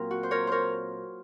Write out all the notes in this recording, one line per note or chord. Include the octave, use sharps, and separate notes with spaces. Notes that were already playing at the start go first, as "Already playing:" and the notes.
Already playing: A#2 F#3 C4 F4 A#4
F#4
C5
A#4 C#5
A#4 C5 C#5